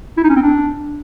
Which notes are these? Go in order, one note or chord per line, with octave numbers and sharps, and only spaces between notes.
E4
D#4
C#4
C4
D4